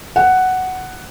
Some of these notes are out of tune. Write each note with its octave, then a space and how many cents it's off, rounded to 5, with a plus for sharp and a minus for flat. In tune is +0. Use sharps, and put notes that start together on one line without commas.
F#5 +5